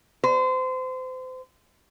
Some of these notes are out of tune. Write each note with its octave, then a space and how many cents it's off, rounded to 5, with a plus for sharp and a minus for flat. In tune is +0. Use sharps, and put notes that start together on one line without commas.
C5 -30